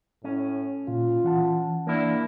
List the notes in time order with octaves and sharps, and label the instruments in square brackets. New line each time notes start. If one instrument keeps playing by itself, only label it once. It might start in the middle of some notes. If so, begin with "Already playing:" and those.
[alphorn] A2 [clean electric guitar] C#4
[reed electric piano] A#2 [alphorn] F4
[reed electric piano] E3 F#5 A5
[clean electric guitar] A#3 E4 [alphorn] D4